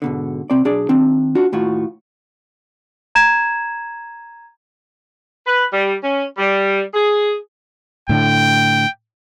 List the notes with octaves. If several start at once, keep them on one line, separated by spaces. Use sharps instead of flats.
G#2 B2 D3
C3 C4 D5
B1 D4 G#4 D5
D#3 C4 D4
D4 F4 F#4
D#2 A2 F4 F#4
A#5 G#6 E7
B4
G3
C#4
G3
G#4
A2 D3 G5